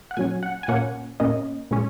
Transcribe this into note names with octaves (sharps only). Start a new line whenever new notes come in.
F#5
A#2 F#3 C#4 G#5
F#5
G#5
A#2 A#3 C#4 F#5
A#2 A#3 C#4 D#5
A#2 G#3 C#4